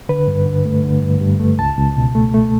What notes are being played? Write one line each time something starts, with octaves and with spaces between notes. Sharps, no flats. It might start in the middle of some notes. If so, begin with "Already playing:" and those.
D3 B4
G2
D3
A3
D3
G2
G2
A3
C#2 A5
C#2
B2
A3
A3